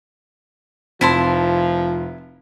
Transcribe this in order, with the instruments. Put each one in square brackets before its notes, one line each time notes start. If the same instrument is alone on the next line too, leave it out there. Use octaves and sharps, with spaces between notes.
[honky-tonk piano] F1 [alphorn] F3 [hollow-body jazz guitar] C4 [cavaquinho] E4 A5 C6